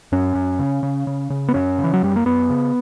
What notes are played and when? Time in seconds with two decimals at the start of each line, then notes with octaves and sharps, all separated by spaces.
0.12 F#2 C#4
0.35 F#2
0.59 C#3
0.83 C#3
1.07 C#3
1.30 C#3
1.48 B3
1.54 F#2 C#4
1.78 C#3
1.84 E3
1.94 F#3
2.03 F#2 G3
2.16 A#3
2.25 F#2 B3
2.50 C#3